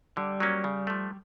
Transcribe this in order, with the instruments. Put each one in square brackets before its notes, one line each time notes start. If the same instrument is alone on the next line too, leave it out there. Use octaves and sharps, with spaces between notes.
[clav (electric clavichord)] D3 [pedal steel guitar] G3
[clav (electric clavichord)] F#3 A#3 C#4
C#3
F3 A3